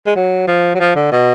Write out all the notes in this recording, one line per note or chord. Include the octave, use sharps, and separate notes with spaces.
G#3
F#3
F3
F#3
F3
D3
B2